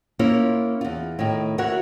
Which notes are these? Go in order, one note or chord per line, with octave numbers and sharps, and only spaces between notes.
A#3 C#4 E4 F4 C#5
E2 F4
A2 D#3
F#4 A#4 C#5 E5 F#5